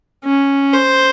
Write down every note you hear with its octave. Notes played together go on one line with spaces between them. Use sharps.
C#4
C5